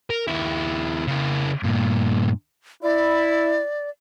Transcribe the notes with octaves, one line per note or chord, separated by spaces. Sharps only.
A#4
D#2 E4
C#3 E4
G2 A#2
E4 D5